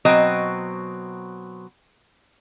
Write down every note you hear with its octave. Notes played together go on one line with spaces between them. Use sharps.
B2 F#3 C4 D#5